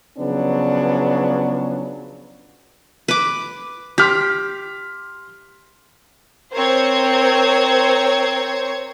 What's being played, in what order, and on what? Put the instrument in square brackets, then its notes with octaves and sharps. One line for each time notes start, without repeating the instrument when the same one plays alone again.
[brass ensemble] C#3 F3 F#3 B3 C#4 D4
[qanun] B4 D6
[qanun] G4 [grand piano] C6 F6 B6
[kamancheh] C4 A#4 [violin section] C5 C#5 G#6